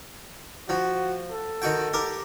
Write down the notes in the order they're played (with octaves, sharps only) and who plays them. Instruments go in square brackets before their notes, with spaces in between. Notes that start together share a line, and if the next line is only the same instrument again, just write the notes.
[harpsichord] F3 [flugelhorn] F#4
[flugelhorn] A4
[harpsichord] D#3 F#4 G5
G4 A#4